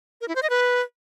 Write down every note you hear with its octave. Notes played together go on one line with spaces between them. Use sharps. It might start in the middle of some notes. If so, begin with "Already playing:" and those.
A#4
E4
C5
D#5
B4